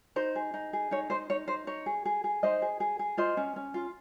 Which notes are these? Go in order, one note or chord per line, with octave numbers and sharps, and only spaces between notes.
D#4 C5
G#4
D#4
G#4
D#4 C#5
D#4 C5 D#5
D#4 C#5
D#4 C5
D#4 C#5
G#4
G#4
G#4
D#4 C5 D#5
G#4
G#4
G#4
F4 C5 D#5
C#4
C#4
F4